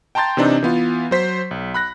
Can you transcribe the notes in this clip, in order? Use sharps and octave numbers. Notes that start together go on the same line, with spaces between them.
G5 A5 A#5 C6 G6 A6
C3 E3 C4 D4 D#4
E3 B3 F4
F#3 C5 B6
B1
B5 F#6 A#6